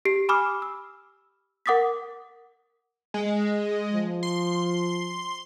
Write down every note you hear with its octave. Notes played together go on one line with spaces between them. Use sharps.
G4 C7
G#5 B5 D6 D#6 F6
E6
A#4 F#5 D6 D#6 A6 B6
G#3
F3
C6